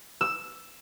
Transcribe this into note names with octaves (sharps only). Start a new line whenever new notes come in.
E6